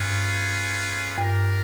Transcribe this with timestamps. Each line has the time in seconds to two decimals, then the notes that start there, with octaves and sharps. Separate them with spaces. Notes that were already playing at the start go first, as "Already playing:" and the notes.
Already playing: G2 A3 C#4 F4 G#4 B4
1.18 G2 D4 G4 A#4